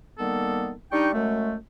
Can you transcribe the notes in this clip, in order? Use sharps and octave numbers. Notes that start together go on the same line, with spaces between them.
D#3 G3 A#3 B3 A4
G3 D4 D#4 G5 C#6
F#2 G#3 A3